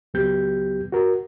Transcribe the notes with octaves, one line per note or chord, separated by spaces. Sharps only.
C#2 F#3 B3 G4 G6
F#4 A#4